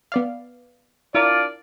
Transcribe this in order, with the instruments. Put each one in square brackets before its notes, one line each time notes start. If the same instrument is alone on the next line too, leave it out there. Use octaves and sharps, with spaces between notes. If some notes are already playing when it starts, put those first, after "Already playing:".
[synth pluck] B3 D5 F5
[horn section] D4 F4 D5 [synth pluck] E4 A#4